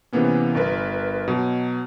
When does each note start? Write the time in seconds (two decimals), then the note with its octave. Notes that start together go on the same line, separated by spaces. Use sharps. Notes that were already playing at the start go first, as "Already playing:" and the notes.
0.13 C3 E3 A#3 B3 C#4
0.55 G1 A#4 B4
1.28 B2 F#3